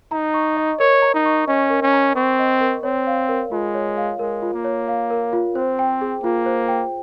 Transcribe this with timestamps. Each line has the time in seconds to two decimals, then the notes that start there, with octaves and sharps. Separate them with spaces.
0.11 D#4 A#5
0.34 C#6
0.57 D#5
0.80 A#4 C#5
1.02 A#5
1.14 D#4
1.25 C#6
1.47 C#4 D#5
1.70 A#4
1.82 C#4
1.93 A#5
2.16 C4 C#6
2.39 D#5
2.61 A#4
2.83 C4 C#5
3.07 F5
3.29 A#4
3.52 G#3 F4
3.74 C#5
3.97 F5
4.19 G#3 A#4
4.42 F4
4.54 A#3
4.64 C#5
4.88 F5
5.10 A#4
5.33 F4
5.55 C4 C5
5.79 G5
6.01 G#4
6.24 A#3 F4
6.46 C5
6.68 G5